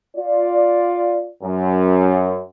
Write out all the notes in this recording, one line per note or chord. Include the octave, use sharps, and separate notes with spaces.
F4 D5
F#2